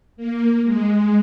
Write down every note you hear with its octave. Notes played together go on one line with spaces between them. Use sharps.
A#3
G#3